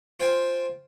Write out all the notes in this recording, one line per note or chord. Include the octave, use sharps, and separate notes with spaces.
F4 C5 G5 G#5